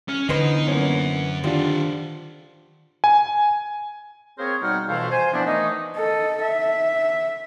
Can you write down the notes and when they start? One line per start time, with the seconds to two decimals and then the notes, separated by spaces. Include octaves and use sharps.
0.08 C#4 F6
0.29 D3 E3 B3 D#4 C5
0.68 F#2 A#3 C#4 F#5
1.44 D#3 D4 F4 G4 C5 F#5
3.04 G#5
4.38 A#3 C4 G#4 A#4 C5 C#5
4.62 B2 G3 D#4 F#5 G5 F6
4.87 F2 B2 E3 A3 C5 F5
5.10 C5 G#5
5.32 E3 F3 B3 C4 D4
5.45 D#3 E3 A3 C#4 D#4
5.96 A4 D#5
6.41 E5